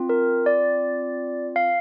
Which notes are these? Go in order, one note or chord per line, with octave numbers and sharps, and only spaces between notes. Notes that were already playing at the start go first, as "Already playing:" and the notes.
Already playing: C4 F4
A#4
D5
F5